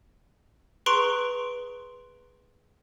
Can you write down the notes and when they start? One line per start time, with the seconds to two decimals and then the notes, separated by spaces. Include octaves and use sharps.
0.86 G#4 B4 A#5 C6 C#6 D7